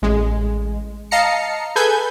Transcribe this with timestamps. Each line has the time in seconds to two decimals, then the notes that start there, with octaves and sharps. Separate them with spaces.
0.02 A1 G#3
1.11 D#5 F5 A5 A#5 C7 C#7
1.76 G#4 A4 B4 G#5 G6 G#6